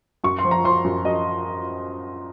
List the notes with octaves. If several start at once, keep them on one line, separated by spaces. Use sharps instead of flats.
F#2 C#6
C6
F3
A#5
F3 C6
F#2
F#2 D#5